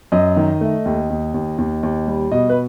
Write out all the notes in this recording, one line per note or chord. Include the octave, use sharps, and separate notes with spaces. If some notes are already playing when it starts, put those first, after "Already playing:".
F#2 D#5
D#3
A3
D#2
D#2
D#2
D#2
D#2
G3
B2 D#5
B4